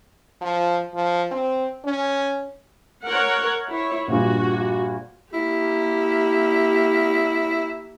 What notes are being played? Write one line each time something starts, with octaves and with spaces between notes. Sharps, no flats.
F3
F3
C4
C#4
A#4 C#5 F#5
E4 C#5
A#1 G2 A#2 F#4
A#3 E4 G4